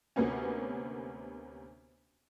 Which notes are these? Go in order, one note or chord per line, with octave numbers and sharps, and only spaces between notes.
D2 C3 A#3 B3 C#4